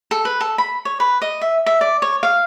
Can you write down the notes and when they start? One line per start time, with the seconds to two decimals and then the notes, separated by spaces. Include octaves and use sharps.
0.11 A4
0.25 B4
0.41 A4
0.58 B5
0.85 C#5
1.00 B4
1.22 D#5
1.41 E5
1.66 E5
1.81 D5
2.02 C#5
2.23 F5